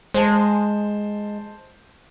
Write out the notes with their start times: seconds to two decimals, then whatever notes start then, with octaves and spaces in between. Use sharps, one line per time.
0.14 G#3 C5 A5